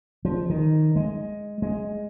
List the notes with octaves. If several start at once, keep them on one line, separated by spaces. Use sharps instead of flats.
F3
D#3
G#3
G#3